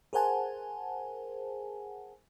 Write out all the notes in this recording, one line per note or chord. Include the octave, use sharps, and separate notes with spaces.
G#4 A#4 C5 F#5 G#5 A5